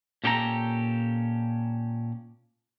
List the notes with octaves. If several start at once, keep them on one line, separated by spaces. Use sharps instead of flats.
A#2 C#4 G4 A4 B4 A#5